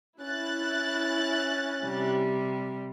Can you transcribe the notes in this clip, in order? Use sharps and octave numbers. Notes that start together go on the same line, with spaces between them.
C#4 E4 F#6 A6
C3 G3